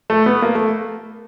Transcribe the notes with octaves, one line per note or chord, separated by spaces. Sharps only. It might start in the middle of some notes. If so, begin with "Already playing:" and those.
A3
B3
A#3
A3